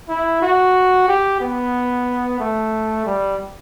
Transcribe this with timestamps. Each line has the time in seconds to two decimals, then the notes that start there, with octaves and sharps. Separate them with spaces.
0.09 E4
0.42 F#4
1.08 G4
1.41 B3
2.40 A3
3.06 G3